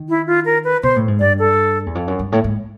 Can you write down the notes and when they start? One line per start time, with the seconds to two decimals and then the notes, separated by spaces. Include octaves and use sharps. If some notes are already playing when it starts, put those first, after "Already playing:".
Already playing: D#3
0.09 E4
0.27 F4
0.45 A#4
0.64 B4
0.83 B2 C5
0.96 A2
1.08 G#2
1.20 G2 D5
1.39 A4
1.86 E2
1.95 F2
2.08 F#2
2.19 G2
2.32 A2
2.44 G#2